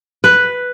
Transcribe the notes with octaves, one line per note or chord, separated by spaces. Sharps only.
B4